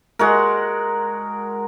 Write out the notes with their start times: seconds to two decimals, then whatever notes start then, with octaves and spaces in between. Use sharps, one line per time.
0.19 G#3 F#4 A#4